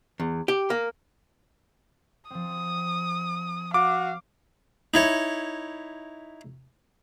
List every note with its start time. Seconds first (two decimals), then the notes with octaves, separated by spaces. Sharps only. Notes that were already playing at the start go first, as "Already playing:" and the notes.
0.20 E2
0.48 G4
0.70 A#3
2.31 F3 C4 D#6
3.74 F#4 F5 D6
4.94 D#4 E4 C#5